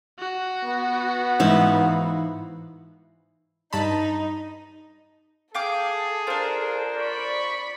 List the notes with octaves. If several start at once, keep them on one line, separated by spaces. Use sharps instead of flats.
F#4
B3
G#2 E3 D#4 E4 F5
G2 D#4 A5 B5
G#4 A4 F5 G5 D6
D4 F4 A#4 C5
D5 B5 C#6